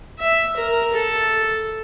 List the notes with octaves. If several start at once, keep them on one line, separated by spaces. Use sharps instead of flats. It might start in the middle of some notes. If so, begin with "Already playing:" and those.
E5
A#4
A4